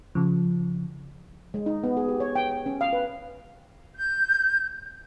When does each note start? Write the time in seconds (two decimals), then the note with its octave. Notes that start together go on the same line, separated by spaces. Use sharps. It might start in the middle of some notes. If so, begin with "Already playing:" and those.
0.15 C#3 F3
1.54 G#3
1.66 D#4
1.84 B3
1.97 G#4
2.09 G4
2.20 C#5
2.36 G5
2.51 G5
2.66 C#4
2.81 F5
2.93 B4
3.95 G6